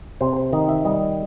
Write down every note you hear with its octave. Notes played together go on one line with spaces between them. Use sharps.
C3 C5
C5
D#3 D#5
E5
G3 D#5